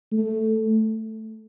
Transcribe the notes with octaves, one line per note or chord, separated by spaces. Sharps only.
A3